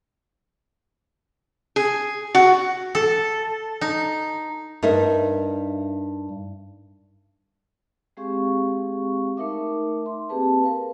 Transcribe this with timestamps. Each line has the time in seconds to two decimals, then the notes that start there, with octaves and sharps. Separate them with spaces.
1.76 G#4
2.35 F#4
2.95 A4
3.81 D#4
4.83 G2 D#4 A#4 E5
8.17 G#3 C4 G4 G#4 F5 C#6
9.37 A3 D#4 A#4 E5 D6
10.06 C6
10.29 A#3 C4 G4 G#4 B4 A5
10.64 A#4 B4 F5